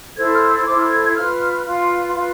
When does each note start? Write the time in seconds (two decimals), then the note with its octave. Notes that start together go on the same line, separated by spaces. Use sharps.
0.16 E4 A4 C5 G#6
0.34 F6
0.50 E6
0.66 E4 A4 C5 D6
0.78 F6
0.91 G#6
1.03 G#6
1.16 F4 B4 F6
1.64 F4 B4
2.14 F4 B4